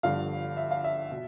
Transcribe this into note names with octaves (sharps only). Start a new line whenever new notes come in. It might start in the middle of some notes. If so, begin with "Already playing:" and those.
G1 G2 D3 F3 F5
E5
F5
E5
B2